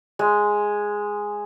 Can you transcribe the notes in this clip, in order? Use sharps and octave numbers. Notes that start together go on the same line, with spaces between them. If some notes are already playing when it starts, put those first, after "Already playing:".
G#3